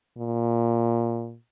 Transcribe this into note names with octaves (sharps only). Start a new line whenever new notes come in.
A#2